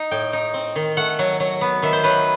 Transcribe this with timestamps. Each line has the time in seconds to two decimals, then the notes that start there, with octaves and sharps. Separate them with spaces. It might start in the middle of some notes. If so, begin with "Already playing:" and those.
Already playing: D#4
0.11 A2 G5
0.33 D#4
0.54 C4
0.76 D#3
0.97 A3 F#5
1.19 F#3
1.40 F#3
1.61 B3
1.82 D#3 E5
1.93 C5
2.03 F#3 B4